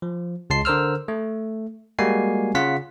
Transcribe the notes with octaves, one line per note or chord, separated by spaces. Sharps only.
F3
C#2 G#3 A5 C6 C7
D3 A#4 C5 E6 F6
A3
G3 G#3 A#3 F#4 G#5 C7
C#3 F4 F#5 B6